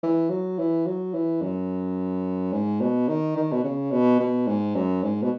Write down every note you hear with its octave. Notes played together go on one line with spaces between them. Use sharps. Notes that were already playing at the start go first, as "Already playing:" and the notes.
E3
F#3
E3
F#3
E3
F#2
G#2
B2
D#3
D#3
B2
C#3
B2
B2
G#2
F#2
G#2
B2